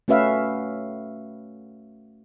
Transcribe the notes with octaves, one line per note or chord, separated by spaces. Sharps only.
A3 C#4 F#4 B4 E5 F5